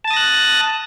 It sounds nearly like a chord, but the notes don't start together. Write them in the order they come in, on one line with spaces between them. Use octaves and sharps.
A5 A6 D#6 A#6 F#6